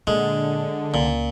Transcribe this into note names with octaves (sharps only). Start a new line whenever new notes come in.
A#2 D3 G#3
C#2 A#2